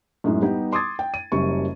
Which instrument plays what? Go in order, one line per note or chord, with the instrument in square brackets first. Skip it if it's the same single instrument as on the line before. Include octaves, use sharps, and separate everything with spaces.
[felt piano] F#2 A2 G#3 D#4
G3 B3 D#4 G4
C6 D6 D#6 G#6 A6
G5
D#7
F#1 F#2 C#3 G3 C#4 C#6